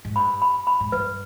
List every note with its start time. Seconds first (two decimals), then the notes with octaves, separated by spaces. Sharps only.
0.05 G#2
0.16 G2 B5
0.42 B5
0.67 B5
0.80 G#2
0.92 G2 B4